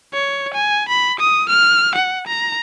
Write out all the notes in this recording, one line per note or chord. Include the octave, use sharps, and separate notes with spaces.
C#5
G#5
B5
D#6
F6
F#5
A#5